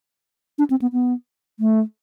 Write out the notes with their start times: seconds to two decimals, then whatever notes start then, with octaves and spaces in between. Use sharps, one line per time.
0.59 D4
0.70 C4
0.82 B3
0.93 B3
1.60 A3